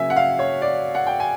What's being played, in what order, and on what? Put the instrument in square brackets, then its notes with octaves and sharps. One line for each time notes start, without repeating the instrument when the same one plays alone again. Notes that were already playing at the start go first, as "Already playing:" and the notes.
Already playing: [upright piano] C#3 F#3 A#3 E5 G#5
F#5
F5
C#5
D5
F#5
G5
G#5